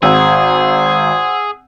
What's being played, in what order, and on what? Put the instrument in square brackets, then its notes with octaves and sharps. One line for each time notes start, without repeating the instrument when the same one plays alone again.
[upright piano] G#1 [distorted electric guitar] G#4 [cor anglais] C5 [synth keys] F#5 E6